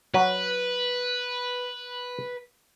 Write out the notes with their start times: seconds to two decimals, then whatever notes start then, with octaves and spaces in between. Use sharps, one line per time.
0.14 F#3 B4